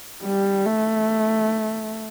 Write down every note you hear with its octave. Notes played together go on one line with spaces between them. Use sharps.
G3
A3